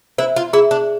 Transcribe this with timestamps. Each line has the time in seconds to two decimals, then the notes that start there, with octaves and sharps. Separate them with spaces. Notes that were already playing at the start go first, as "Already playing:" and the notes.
0.18 E4 C5
0.36 F4
0.53 E4 G#4
0.71 D4